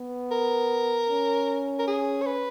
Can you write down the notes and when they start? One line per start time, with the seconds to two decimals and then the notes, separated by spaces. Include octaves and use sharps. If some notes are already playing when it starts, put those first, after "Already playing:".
Already playing: B3
0.31 A#4
1.09 C#4
1.79 A#4
1.87 G#4
2.22 C#5
2.26 B4